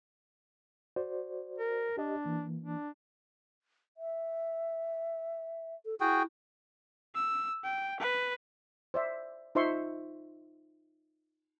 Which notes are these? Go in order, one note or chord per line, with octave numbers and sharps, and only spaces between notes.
F#4 C5 D5
A#4
D4 G4 D#5
E3 A#3
D4
E5
A4
E4 F#4 G#4 G5
E6
G5
B4
C5 D5 E5
D#4 F4 C5 E5 C6 C#6